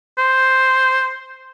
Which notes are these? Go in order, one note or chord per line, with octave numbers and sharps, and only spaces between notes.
C5